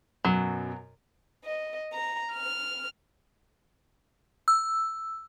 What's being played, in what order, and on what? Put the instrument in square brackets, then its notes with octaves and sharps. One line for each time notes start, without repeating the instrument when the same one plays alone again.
[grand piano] F#2 B2 [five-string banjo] F#3
[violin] D#5
A#5
F6
[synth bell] E6